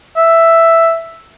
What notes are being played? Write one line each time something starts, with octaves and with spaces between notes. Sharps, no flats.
E5